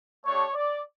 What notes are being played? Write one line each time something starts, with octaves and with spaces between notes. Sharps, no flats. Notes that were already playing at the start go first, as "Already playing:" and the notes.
A3 D4 G4 C#5
D5